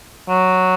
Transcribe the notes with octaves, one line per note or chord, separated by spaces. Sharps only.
F#3